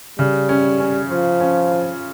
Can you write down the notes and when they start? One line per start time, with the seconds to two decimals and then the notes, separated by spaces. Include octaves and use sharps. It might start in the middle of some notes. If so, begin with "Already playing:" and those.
0.19 C#3 G3
0.49 C#4
0.80 C#4
1.10 F3 F4
1.40 C#4
1.72 F4